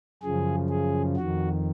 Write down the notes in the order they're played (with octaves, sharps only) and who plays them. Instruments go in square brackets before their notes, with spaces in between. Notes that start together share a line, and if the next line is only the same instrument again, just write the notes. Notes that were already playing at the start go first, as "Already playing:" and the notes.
[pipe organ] F#2 C#3 F3 G#4
G#4
F2 D#3 F#4